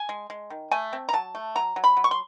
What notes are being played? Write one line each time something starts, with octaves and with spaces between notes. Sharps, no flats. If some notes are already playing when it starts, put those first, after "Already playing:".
Already playing: G#5
G#3
G#3
D#3
A3 G#5
C4
A#5
F#3 A5
A3
F#3 A#5
F#3
B5
F#3
C#6
C6